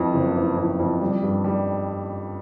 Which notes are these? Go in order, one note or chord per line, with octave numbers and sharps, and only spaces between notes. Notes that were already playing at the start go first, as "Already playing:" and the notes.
Already playing: F2 E3
F#1
E3
F2
F2
G3
G2
G3